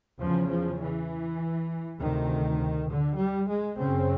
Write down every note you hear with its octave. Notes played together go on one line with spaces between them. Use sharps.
E2 C#3 F3
F3
E3
D2 C3 D#3
D3
G3
G#3
F#2 C#3 C4